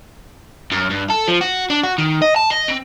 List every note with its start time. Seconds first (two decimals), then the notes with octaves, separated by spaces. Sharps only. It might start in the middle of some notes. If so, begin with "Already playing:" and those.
0.72 F#2
0.90 G2
1.10 A4
1.28 F3
1.41 F#4
1.70 D4
1.84 F#4
1.98 D#3
2.22 D#5
2.36 A5
2.51 D#5
2.68 C4